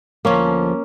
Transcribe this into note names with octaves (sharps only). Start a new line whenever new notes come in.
D2 F3 A#3 C#4